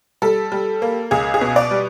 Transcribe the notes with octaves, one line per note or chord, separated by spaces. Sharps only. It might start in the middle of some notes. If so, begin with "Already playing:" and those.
G3 A4
G3
A#3
C#2 G#4
G#4
B2
D5
G3